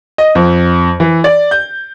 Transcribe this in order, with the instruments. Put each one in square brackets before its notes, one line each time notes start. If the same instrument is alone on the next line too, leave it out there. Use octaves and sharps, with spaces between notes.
[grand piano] D#5
F2
E3
D5
G6